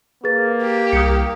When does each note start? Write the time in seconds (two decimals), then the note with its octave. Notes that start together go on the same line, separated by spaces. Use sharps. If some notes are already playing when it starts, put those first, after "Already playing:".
0.24 A#3 G#4 B4 A6
0.63 G4
0.92 C2 D#6 C#7